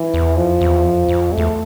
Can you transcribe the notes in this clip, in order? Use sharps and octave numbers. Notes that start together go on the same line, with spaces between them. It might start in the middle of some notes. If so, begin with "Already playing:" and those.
Already playing: E3
E2
F2 F3
E2
F2
F2
E2 A3